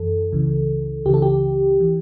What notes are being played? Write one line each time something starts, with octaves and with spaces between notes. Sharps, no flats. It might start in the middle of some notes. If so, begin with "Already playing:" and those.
Already playing: F#2 E3 A4
C#2 C#3 E3
C#2 C#3 E3 G4
A4
G4
E3